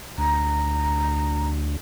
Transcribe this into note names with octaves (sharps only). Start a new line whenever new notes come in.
D2 A#5